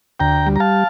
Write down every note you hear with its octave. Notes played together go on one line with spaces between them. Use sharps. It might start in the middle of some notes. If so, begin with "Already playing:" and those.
D2 G5 A#5
G3
A#5
F5 A5